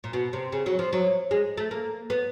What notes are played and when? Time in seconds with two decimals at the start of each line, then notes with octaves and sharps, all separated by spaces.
0.04 A#2
0.13 B2
0.33 C3
0.52 C#3
0.66 F#3
0.79 F3
0.93 F#3
1.31 G#3
1.57 A3
1.71 A#3
2.10 B3